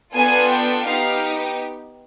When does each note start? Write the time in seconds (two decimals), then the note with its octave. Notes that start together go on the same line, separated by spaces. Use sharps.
0.14 B3 D4 F4 A4 G#5
0.50 G5
0.85 B3 D#4 G4 F5